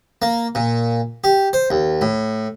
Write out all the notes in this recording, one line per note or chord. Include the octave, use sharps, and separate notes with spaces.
A#3
A#2
G4
C5
D#2
A2